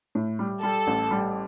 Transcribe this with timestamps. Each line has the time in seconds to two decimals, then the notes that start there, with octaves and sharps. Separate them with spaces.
0.15 A2
0.39 G3
0.63 G3 A4
0.87 A1
1.11 G3